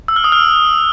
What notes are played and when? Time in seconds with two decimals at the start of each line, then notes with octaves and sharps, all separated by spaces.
0.08 E6
0.16 F6
0.24 D#6
0.32 F6